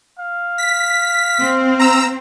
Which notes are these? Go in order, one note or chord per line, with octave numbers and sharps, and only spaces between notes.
F5
B6
C4
A#5 E6